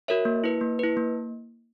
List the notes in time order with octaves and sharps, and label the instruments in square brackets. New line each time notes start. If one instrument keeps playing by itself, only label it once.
[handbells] F#4 A#4 C#5 E5
A#3
E4 B4
A#3
E4 B4
A#3